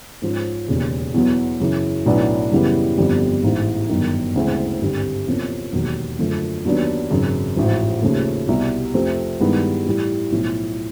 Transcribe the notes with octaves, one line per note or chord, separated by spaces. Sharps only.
G#2 F3 G#3 C#4
E1 D#2 C#3
E2 B2 F#3 B3
F#2 C#3 E3
B1 A2 F#3 B3 D4
F#2 C#3 E3 G3 B3
G1 F2 D3 G3
A1 G#2 E3
G1 F#2 D#3
D2 C#3 E3 G#3 C4
G#1 G2 D3 G3 C4
E2 C3 F3 A#3 C#4
E1 D#2 D#3 F#3
F#2 D3 F3 A3
D#2 D#3 F#3 B3 D4
G#1 F#2 C#3
A1 G#2 F3
D#2 C#3 F3 A3
C2 B2 G3
F2 C3 F3 A3 C4
G2 D#3 G#3 B3 E4
A2 E3 G3
B1 A2 F3